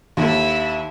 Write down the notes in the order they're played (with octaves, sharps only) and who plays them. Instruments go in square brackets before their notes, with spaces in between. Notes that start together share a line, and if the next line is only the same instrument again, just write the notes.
[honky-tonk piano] D#2 A4 [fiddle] E4